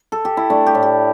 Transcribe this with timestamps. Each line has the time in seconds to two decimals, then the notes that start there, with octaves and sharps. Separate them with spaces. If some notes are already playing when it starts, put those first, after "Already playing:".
Already playing: C5
0.12 A4
0.25 G4
0.37 E4
0.50 A3 D4
0.67 G4
0.75 A2
0.83 G4